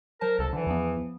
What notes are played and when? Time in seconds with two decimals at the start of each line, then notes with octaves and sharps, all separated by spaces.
0.21 F#3 A#4 C5 A5
0.39 C2 A4
0.53 D3 E3
0.66 E2 F3 B3